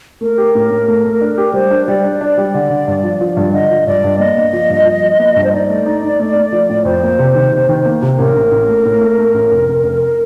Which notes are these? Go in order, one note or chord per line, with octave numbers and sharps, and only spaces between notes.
A3 A#4
G4
A2
A2
A3
A3
D4
G4
G3 C5
D4
G3 D5
D4
D4 D5
G3
D3
D3
G2
F3
F3
G2
D3 D#5
F3
G2 D5
G2
A#3 D#5
A#3
F3
G2
F3
F3
A#3
G2
C5
D#4 D5
A3
D#4
D#4
A3
A3
F3
A2
F2 C5
A#3
C3
D#3
C3
D#3
A#3
C3
A1 A#4
A1
A1
A3
A2
A3
A3
A1
F1
F1
F1